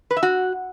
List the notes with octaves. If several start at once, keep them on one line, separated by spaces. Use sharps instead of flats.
B4
E5
F#4